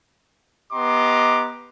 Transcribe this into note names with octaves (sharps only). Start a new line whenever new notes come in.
B3 G4 D#5 A#5 C6 D6